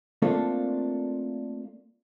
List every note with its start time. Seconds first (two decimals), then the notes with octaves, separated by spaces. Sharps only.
0.22 A3 A#3 C4 D4 F4 A4